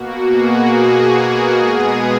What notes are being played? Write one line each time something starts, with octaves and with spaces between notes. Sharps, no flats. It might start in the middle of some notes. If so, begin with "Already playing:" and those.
Already playing: B2 A#3 F#4
G#4
A#4
B2 G#3 B3 G#4